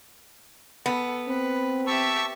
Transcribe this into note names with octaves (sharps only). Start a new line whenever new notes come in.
B3 A4
C4 B4
G4 E5 A5 C#6 E6